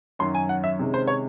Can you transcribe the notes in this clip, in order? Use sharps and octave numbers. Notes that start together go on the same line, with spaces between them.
F#2 D#3 F#3 C#4 C6
G#5
F#5
E5
C3 D#3 G#3 C#4
C5
C#5